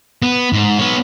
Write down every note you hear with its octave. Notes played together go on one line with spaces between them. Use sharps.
B3
G#2
B3 C#5